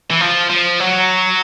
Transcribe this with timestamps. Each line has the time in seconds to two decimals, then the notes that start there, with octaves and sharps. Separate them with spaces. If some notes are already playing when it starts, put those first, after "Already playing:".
0.10 E3
0.21 F3
0.50 F3
0.80 F#3